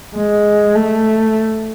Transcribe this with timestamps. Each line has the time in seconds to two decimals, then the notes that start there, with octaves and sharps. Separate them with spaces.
0.16 G#3
0.75 A3